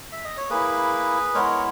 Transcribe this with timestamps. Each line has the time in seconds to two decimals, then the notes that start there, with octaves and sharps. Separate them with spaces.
0.12 E5
0.24 D#5
0.37 C#5
0.50 A#3 E4 G#4 B4
1.34 G#3 B3 E4 A#4 C#5